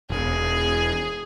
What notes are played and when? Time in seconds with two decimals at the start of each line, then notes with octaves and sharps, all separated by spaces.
0.10 E1 G#4